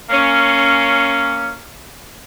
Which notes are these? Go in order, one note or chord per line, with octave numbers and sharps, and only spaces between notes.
A#3 C#4